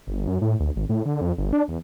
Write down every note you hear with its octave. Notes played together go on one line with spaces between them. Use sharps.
G1
F#2
A2
D2
G#1
A2
D3
F2
G1
D4
E2